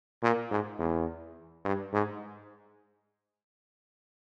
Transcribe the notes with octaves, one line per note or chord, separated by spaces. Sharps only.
A#2
G#2
E2
G2
G#2